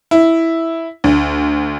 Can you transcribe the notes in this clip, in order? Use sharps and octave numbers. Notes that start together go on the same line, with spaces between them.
E4
D2